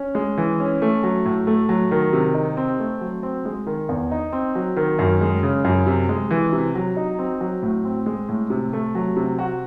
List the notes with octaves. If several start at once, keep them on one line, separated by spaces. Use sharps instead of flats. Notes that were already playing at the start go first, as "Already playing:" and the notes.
Already playing: C#4
G#3
E3
C#4
A3
F#3
A2
A3
F#3
D#3
C3
D#4
C4
A3
F#3
C4
G#3
D#3
E2
D#4
C4
F#3
D#3
F#2
G#3
C#3
F#2
C3
G#3
E3
C3
F#3
D#4
C4
F#3
A2
C4
G#3
A2
C3
A3
F#3
C3
F#4